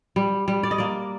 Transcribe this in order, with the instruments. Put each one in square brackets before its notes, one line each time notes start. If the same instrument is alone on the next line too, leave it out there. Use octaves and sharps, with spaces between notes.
[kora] G3
G3
D5
D#5
A#3 D5